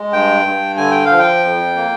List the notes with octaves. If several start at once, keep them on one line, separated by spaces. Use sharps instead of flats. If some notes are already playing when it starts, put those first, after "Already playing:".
Already playing: G#3
G2 G5
G2
D3 G#5
G5
F5
F3
G5
F2
A#3